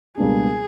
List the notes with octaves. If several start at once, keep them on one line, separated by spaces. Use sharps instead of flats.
C#2 B2 G3 A#3 D4 G#4